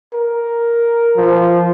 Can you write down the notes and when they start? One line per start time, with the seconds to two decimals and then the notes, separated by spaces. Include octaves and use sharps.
0.14 A#4
1.16 F3